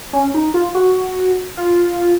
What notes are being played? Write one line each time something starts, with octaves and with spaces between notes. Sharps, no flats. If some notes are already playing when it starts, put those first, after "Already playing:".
C#4
D#4
F4
F#4
F4